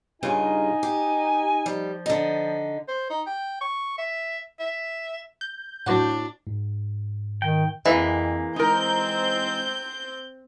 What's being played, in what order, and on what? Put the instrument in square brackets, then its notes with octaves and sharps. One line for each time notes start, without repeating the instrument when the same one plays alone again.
[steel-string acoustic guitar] G2 C#3 F4 [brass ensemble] D#4 [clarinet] G#5
[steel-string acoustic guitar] G4
[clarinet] F3 [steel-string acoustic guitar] G3
[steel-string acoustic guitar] D3 D#4
[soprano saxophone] C5
D#4
G5
C#6
E5
E5
[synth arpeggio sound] G6
[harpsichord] F#2 D5 F#5 [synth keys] A2 F#4 [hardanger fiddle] D4
[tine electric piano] G#2
[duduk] D#3 [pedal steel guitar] G5
[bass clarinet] F2 [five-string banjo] E3 [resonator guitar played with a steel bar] G#3 A#3 B4
[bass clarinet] G#3 [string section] C4 G6 [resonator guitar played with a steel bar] D#4 A#4